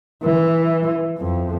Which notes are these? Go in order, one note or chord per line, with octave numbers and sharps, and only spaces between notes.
E3
F2